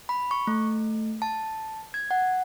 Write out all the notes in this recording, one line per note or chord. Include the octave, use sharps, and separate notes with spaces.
B5
C#6
A3
A5
G#6
F#5